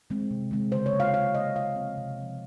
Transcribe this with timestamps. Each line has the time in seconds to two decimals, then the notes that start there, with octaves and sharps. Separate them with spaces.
0.10 D#3 G#3 C4
0.31 C3
0.51 D#3 G#3 C4
0.72 C#3 C5
0.86 C#5
0.93 F#3 A#3
1.00 F5
1.14 C#3 F5
1.35 F#3 A#3 D#5
1.56 C3 F5
1.76 F3 C4
1.97 C3
2.18 F3 C4